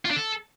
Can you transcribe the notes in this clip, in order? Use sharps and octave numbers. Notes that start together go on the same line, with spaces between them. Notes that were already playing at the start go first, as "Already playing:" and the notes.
F4
D4
A4